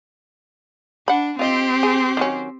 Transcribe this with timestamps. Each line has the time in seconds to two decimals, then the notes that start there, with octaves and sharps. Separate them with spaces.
1.08 D4 F#5 B5
1.39 C4 F4 G4 D#5
1.83 G#4
2.17 D#3 F#3 C#4